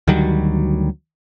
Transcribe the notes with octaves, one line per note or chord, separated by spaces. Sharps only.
D2 D#3 F#3 G3